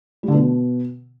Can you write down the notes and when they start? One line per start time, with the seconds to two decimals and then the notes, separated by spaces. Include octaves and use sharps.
0.23 G3
0.28 D3
0.33 B2